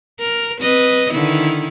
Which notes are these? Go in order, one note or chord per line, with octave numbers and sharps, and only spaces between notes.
A#4
C4 B4 D#5
D3 D#3 E4